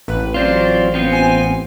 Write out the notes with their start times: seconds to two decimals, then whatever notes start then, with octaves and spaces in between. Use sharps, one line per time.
0.08 A1 B4
0.34 F#3 C4 F4 D5
0.94 B3 C4 F4
1.12 G#5